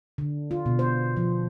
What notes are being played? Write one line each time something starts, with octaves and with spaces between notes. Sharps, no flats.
D3
F4
B2
C5
F3